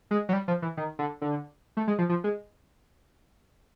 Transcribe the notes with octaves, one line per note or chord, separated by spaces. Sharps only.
G#3
F#3
G3
F3
E3
D#3
D3
D3
A3
G#3
F3
F3
G#3